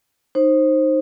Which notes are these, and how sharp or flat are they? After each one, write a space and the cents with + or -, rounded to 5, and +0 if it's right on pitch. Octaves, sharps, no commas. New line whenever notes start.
D#4 -10 C5 +20